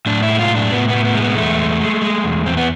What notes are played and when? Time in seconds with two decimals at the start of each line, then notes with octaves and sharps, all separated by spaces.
0.06 A2 D4
0.23 E4
0.28 G#3
0.39 F4
0.50 A2
0.55 D4
0.72 A2 B3
0.89 A2 B3
1.04 B3
1.15 G#3
1.21 B3
1.37 E2 A3
1.59 G#3
1.80 G#3
2.02 G#3
2.24 E2
2.46 E2 C4
2.57 B3